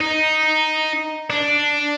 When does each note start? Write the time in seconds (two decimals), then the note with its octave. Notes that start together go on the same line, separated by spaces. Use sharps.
0.01 D#4
1.30 D4